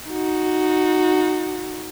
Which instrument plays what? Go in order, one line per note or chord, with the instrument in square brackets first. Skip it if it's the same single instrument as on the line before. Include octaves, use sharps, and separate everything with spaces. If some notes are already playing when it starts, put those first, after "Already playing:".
[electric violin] D#4 F#4